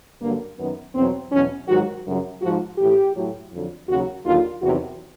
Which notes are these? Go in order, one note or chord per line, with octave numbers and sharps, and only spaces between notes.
G2 D3 F#3 A#3
F#2 D#3 F#3 B3
E2 B2 F#3 C4
E2 B2 F#3 C#4
G#2 D#3 F#3 F#4
F#2 C#3 F#3
G#2 F3 F#4
A2 E3 G4
A2 F#3
F2 D3 F#3
D#2 C#3 F#3 F#4
D#2 D3 F#3 F4
E2 C3 D#3 F#3 F#4